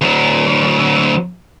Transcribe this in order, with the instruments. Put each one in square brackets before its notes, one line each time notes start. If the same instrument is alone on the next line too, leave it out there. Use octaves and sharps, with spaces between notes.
[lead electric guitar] D2 F#3